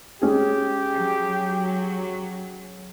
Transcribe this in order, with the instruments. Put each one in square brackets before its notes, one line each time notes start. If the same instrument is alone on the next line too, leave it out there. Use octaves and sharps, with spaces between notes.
[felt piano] G#3 C#4 G#4 [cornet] G4
[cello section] F#3